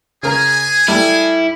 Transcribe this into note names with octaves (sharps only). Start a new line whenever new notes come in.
C#3 G#4 A#4 G#5
G3 A3 E4